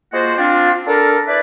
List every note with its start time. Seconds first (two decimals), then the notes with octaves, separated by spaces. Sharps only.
0.13 G#3 A#3 F4 F#4 C5
0.37 C4 D4 F4
0.86 D4 A4 A#4
1.27 E4 B4 D5